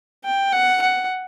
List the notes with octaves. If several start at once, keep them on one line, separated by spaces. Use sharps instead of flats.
G5
F#5
F#5